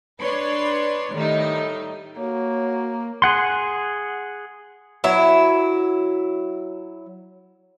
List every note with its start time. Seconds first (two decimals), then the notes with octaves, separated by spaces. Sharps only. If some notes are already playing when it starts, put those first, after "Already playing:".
0.21 D4 B4 C#5 C6
1.14 A2 D#3 G3 D#4
2.17 A#3 F#4 C#5
3.22 G#4 F#5 C6
5.04 F#3 E4